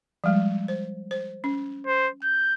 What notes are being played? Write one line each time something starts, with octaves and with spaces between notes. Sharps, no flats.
F3 G3 G#3
C5
C5
C#4
C5
G6